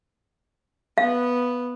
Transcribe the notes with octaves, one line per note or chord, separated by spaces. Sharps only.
B3 B4 F5